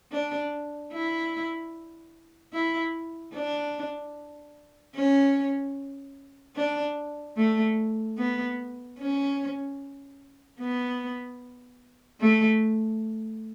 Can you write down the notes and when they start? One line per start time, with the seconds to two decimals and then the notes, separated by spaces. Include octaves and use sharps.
0.12 D4
0.93 E4
2.53 E4
3.34 D4
4.95 C#4
6.56 D4
7.37 A3
8.18 B3
8.98 C#4
10.60 B3
12.20 A3